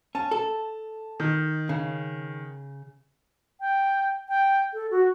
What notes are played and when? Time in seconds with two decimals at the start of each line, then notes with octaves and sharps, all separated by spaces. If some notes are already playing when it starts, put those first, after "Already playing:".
0.15 C#4 A5
0.31 A4
1.20 D#3
1.69 C#3
3.60 G5
4.29 G5
4.73 A4
4.91 F#4